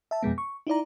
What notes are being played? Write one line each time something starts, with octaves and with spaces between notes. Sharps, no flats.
E5 A5
F2 B2 G#3 B3
C#6
D#4 E4 D5 A#5